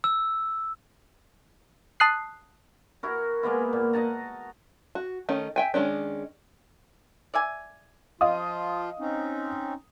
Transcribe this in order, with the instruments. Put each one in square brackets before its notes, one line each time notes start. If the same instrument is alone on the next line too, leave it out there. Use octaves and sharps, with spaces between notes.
[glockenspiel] E6
[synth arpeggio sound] A5 D#6 F#6 C7
[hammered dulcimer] E4 F#4 A#4
G#3 A#3 B3 E4
A#2
D#5 F#5 A5 A#5
[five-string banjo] F#4
D#3 A3 C#4 D#4
E5 G5 G#5
D#3 G#3 C#4 D4
[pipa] D5 E5 G#5
[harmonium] F3 F4 [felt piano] D#5 F5 D#6
[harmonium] C4 C#4 D#4